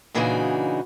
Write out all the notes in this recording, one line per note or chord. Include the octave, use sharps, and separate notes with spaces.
A#2 C#3 E3 D4 D#4 F#4